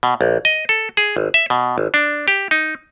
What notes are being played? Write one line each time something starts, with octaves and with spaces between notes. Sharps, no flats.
B2
A#1
D#5
A4
G#4
G#1
E5
B2
G#1
D4
G4
D#4